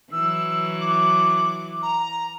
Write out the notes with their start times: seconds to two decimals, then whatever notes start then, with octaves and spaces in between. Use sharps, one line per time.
0.12 E3 F#3 E6
0.80 D6
1.82 A#5